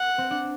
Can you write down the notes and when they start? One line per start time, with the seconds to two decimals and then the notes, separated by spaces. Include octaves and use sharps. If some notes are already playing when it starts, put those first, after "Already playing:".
Already playing: F#5
0.18 C4
0.30 D4